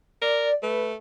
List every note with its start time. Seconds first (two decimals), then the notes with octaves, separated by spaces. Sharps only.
0.22 A#4 D5
0.63 A3 B4